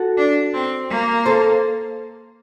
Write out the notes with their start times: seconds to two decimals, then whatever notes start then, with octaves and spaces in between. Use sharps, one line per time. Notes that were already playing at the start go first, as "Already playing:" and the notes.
Already playing: F#4 A4
0.17 D4
0.54 C4
0.90 A#3
1.26 A4 C5